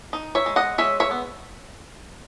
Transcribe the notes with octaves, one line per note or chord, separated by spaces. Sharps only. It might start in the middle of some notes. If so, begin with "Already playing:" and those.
D#4
C#5 E5
G#3
D#5 F#5
G#3 C#5 E5
C#5 E5
B3